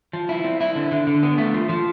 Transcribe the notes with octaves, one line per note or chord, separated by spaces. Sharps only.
F3
E4
C4
E4
D3
D3
D3
B3
A3
F3
F3